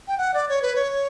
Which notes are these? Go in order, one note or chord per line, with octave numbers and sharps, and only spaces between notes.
G5
F#5
D5
C#5
B4
C#5